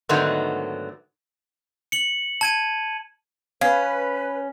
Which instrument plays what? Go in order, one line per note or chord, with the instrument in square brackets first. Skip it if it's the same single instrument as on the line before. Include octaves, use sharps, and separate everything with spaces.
[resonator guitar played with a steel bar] G#2 D3 D#3 F#3 A3 B3
[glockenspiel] C#7 F#7
A5 G#6 D#7
[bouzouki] C#4 [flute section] B4 [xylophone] F5